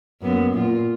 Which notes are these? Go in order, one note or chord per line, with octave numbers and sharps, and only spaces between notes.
F#2 A#3 B3
A#2 F4